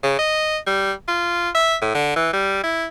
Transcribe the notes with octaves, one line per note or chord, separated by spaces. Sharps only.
C#3
D#5
G3
F4
E5
A2
D3
E3
G3
E4